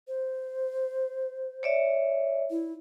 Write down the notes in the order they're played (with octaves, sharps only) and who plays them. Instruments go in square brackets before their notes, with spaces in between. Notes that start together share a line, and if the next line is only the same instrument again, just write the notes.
[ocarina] C5
[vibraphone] C#5 D5 E5
[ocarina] E4